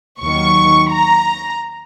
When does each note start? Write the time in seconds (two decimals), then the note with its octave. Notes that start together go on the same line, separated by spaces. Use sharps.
0.20 D#2 D#3 F#3 C#6
0.90 A#5